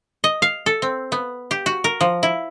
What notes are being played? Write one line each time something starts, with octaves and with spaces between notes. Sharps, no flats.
D#5
F5
A4
C4
B3
G4
F#4
A#4
F3
E4